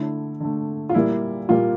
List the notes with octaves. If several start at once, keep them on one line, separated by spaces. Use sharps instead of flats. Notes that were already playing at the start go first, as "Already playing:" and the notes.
Already playing: D3 A3 E4
D3 A3
F4
A#2 G3 A#3 E4
A#2 G3 A#3 F4